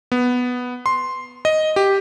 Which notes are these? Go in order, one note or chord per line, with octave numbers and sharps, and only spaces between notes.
B3
C6
D#5
G4